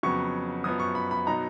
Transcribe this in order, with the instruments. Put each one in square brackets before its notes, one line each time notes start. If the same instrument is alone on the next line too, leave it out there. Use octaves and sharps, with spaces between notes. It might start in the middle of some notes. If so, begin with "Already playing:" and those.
[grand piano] F2 C#3 F#3 B3 C#6
F#2 F3 B3 D#6
C#6
B5
B5
B2 F#3 B3 D#4 A#5